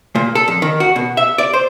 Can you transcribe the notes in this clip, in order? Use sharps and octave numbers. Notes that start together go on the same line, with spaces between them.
A#2
A4
F2
D#3
F#4
B2
E5
D5
C5